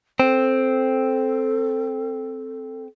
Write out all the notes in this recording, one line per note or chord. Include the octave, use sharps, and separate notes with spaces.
C4 A4